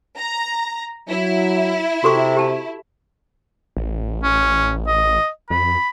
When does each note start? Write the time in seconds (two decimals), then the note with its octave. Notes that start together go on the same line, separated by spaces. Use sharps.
0.16 A#5
1.09 F#3 E4
2.04 C3 F#4 A4 C#6
2.37 G4 A5
3.77 A1
4.23 C#4
4.87 D#5
5.50 F2 B5